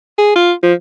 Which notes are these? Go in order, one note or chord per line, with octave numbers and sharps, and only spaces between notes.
G#4
F4
F3